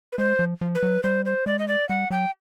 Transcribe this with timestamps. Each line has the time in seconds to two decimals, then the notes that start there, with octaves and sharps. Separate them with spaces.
0.12 B4
0.18 G#3 C5
0.39 F3
0.61 F3
0.75 B4
0.83 F#3
1.03 G3 C5
1.25 C5
1.46 G#3 D5
1.59 D#5
1.68 D5
1.89 G3 F#5
2.10 F#3 G5